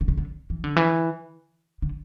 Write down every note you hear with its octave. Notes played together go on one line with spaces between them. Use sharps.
D3
C3
D3
E3
D3
E3
D3